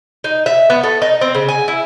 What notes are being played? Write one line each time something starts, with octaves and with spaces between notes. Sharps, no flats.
D#4
E5
B3
A3
D#4
C4
C#3
G#5
E4